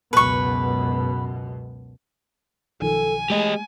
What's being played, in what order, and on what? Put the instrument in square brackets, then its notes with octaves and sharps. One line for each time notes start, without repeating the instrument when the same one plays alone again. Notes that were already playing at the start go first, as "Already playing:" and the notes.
[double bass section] C#2 F#2 B2 [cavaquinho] B4 C#6
[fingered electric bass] B1 D#3 F3 [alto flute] A4 [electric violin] G#5
[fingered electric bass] G#3 A3 [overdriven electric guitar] G4 D#5 [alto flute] G#4